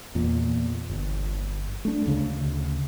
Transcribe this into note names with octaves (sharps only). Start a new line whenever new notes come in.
E2 A#2
G1
A3 D4
D2 C#3